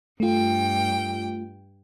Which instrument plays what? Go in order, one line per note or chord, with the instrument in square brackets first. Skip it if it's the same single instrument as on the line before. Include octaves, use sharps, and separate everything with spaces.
[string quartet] G2 G5 [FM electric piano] A3 F4